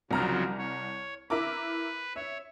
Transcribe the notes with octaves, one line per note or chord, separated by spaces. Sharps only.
C2 C#3 F3 F#3 A#5 F6
C#5
E4 A#4 B4 D6
C#5 E5